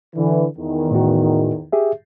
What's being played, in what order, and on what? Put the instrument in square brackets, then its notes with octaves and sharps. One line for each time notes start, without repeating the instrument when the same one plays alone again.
[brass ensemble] D3 E3
E2 D#3
[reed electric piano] A2 F#4
G4 G#4 E5